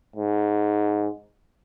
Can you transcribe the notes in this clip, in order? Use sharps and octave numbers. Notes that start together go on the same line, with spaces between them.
G#2